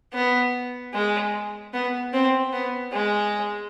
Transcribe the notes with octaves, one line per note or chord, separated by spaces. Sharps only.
B3
G#3
B3
C4
B3
G#3